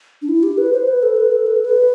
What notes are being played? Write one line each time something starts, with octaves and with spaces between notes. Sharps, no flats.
D4
E4
G4
B4
C5
B4
A4
B4
A4
B4
A4
B4